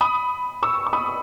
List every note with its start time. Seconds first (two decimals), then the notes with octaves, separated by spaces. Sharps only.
0.01 B5 D#6
0.63 C#6 E6
0.86 C#6
0.93 B5 D#6